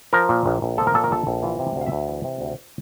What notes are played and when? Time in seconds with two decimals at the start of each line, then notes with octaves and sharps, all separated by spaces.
0.13 F3 A#4
0.29 A#2
0.46 A#1
0.62 A#1
0.78 F3 A4
0.87 A#4
0.94 A#2 A4
1.04 A#4
1.11 A#1 A4
1.27 A#1
1.43 E3 F4
1.59 C3
1.76 D2
1.81 F5
1.86 E5
1.92 D2
2.08 E3
2.24 C3
2.41 D2